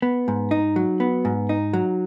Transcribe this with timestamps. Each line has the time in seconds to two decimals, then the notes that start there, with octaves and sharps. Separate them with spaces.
0.02 B3
0.28 G#2
0.51 D#4
0.76 F#3
1.00 B3
1.25 G#2
1.49 D#4
1.73 F#3